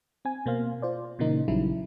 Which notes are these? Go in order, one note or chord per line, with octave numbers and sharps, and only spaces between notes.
C4 G#5
B2 A#3 C5 F5
F4 C5 D5
A#2 C#3 E3 A#3 D#4
A#1 C#3 F#3 G3 D#4 E4